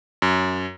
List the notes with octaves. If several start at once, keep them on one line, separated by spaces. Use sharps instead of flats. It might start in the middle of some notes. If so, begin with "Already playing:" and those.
F#2